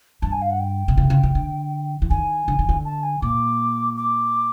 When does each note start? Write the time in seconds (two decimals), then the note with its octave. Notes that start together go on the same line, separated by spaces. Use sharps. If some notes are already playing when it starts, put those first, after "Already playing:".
0.22 G2 A5
0.32 G#5
0.42 F5
0.51 F#5
0.60 G5
0.88 C3
0.97 C#3
1.10 C#3
1.23 C#3
1.35 D3
2.02 E3
2.10 D#3 G#5
2.48 D3
2.59 D#3
2.69 D3
2.85 A5
3.03 G#5
3.22 A#2 D6
3.97 D6